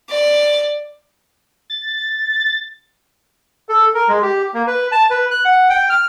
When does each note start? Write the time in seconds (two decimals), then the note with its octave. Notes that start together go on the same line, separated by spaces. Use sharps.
0.10 D5
1.70 A6
3.69 A4
3.94 A#4
4.08 G#3
4.22 G4
4.54 A#3
4.67 B4
4.92 A5
5.10 B4
5.31 F#6
5.45 F#5
5.70 G5
5.90 F6